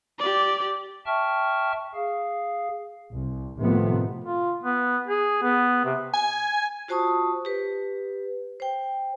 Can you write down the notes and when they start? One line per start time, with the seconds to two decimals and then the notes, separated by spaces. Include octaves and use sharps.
0.19 G4 D5
1.06 E5 G5 A5 C#6 F6
1.94 G#4 F5
3.14 C2
3.59 A2 C3 D#3 F3 A3 B3
4.24 F4
4.64 B3
5.07 G#4
5.42 B3
5.85 C3
6.13 G#5
6.88 F4 F#4 C5 A5 C#6 D#6
7.45 G4 B4
8.60 C5 G5